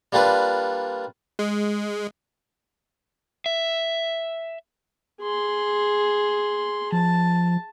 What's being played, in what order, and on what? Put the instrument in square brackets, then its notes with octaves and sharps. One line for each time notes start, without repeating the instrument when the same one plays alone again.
[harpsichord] G3 A#3 D4 F4 B4
[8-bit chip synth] G#3
[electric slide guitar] E5
[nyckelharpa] G#4 C6
[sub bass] F3 [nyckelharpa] A5